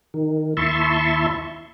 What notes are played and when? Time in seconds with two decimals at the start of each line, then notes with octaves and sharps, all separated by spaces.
0.14 D#3
0.57 D#2 E4 E5 A5 C6 C#6